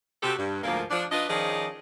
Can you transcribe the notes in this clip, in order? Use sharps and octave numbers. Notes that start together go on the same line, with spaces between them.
C3 C4 F#4 G4 A4
G2
D2 G#2 F3 A#3
F3 D4
D4 F4 B4 D#5
D#3 F3 C#4 G#4 D5 D#5